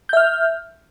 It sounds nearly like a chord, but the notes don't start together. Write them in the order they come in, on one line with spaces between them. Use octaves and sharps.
G6 E5 F6